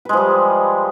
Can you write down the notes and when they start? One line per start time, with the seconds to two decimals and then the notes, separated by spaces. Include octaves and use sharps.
0.05 B4
0.09 G#3
0.13 F3
0.17 G3